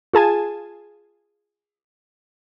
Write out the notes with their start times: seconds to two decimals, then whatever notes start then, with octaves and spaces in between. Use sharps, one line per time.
0.14 F4 G#4 G#5 A5